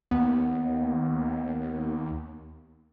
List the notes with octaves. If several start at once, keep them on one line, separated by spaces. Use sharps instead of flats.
D#2 B3